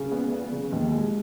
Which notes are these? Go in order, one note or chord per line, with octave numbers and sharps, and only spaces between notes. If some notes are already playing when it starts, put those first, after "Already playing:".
Already playing: C#3
B3
B3
C#3
D#2
G#3